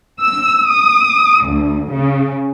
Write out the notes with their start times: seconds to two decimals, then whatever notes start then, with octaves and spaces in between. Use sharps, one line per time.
0.21 E6
0.69 D#6
1.45 D2
1.91 C#3